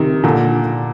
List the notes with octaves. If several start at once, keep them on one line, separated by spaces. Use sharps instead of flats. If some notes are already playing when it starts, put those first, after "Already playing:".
Already playing: C3 D#3
A#2 D3